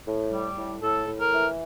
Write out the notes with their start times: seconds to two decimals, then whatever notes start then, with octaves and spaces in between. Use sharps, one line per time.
0.06 A2
0.31 G3
0.57 A2
0.83 A2 A4
1.08 A2
1.20 A#4
1.33 E3